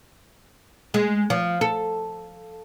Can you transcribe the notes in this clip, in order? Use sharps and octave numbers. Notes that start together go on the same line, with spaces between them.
G#3
F3
A4